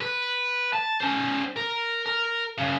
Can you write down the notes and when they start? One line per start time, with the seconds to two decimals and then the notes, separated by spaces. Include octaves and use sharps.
0.01 B4
0.73 A5
1.01 C#4 C5
1.56 A#4
2.06 A#4
2.58 F#2 C#3